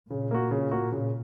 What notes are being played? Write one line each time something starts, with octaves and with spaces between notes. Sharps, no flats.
A#2 C#3
A#3 F#4
C#3
A#3 F#4
C#3